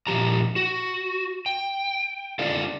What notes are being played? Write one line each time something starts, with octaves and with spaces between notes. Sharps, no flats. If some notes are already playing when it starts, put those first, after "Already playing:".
A#2 F3 G4 A#5
F#4
G5
D4 F4 A4 F5